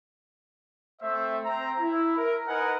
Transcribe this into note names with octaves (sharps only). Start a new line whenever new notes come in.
A3 C4 C5 E5
C4 A#5
E4
A#4
D#4 A#4 B4 D#5 F#5 G#5